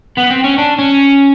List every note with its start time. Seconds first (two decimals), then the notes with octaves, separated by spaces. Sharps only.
0.17 B3
0.30 C4
0.44 C#4
0.58 D4
0.79 C#4